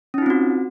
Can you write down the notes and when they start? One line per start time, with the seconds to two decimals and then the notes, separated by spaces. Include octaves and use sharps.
0.14 C#4
0.18 D#4
0.22 F4
0.26 C4
0.30 F#4